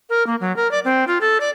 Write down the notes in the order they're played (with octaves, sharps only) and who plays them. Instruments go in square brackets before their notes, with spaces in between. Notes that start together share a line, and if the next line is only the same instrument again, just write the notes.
[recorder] A#4
A#3
F#3
A#4
D5
C4
F4
A4
D5